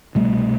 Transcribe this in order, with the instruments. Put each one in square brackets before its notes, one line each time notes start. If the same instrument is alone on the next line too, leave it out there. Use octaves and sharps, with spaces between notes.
[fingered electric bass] C2 B2 G3 A3